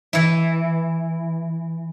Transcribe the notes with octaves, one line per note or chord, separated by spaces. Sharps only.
E3 E4